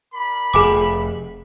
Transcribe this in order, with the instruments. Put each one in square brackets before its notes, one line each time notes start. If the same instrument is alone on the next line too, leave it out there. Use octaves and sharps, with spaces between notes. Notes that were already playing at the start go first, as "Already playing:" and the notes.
[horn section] A#4 D5 B5
[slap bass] F1 [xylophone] G#4 G#5 D6